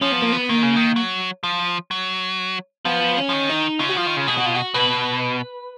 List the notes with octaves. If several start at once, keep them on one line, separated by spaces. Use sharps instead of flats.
F3 C#4
B3
A#3
B3
D#3 A#3
C#3
D#3
F#3
F3
F#3
F3 B3
C#4
F3
D#3
D#4
C#3 F4
F#4
F3 F4
D#3
C#3
B2 G#4
F#4
F4
F#4
B2 B4